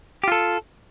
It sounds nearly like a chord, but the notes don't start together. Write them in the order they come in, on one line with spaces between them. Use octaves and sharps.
G4 F4 A4